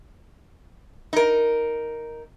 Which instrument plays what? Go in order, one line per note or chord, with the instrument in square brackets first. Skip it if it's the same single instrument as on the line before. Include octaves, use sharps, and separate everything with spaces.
[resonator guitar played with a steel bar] D#4 A#4